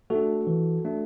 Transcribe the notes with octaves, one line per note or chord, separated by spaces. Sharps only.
A3 D4 F#4 A4
E3
A3 D4